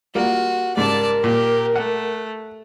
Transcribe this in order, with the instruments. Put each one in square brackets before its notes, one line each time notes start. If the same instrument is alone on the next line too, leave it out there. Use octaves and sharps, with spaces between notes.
[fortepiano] G3 A#3 F4 [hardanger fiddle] F#4
[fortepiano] G#2 C#3 G3 [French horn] A#4 [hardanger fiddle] D5 A5
[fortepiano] A#2 [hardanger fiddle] G4
[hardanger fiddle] A3 [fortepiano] F#5